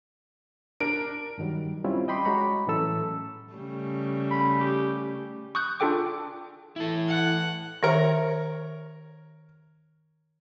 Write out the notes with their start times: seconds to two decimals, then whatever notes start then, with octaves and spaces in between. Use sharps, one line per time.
0.80 D4 A#4 D7
1.38 G2 D#3 F#3 G3
1.85 G3 C4 C#4 E4 F4
2.08 D#5 G5 B5 C6 D6
2.25 G#3 F#4 C#5 A#5 B5 C#6
2.67 A2 E3 F#3 C#4 A4 E6
3.53 C#3 G3 A3
4.31 B5
4.60 G4
5.55 C#6 D#6 F#6 G6
5.80 D4 F4 G#4 A4 G5 D6
6.76 E3 E4 A4
7.10 F#5
7.83 D#3 A#4 C#5 E5